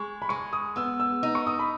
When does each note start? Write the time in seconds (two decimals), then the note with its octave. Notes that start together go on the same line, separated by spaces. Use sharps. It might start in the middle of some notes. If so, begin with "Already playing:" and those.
Already playing: G#3 C#6
0.22 B5
0.29 G#3 C#6
0.53 D#6
0.76 B3 E6
1.00 E6
1.23 D#4
1.35 C#6
1.47 D#6
1.59 B5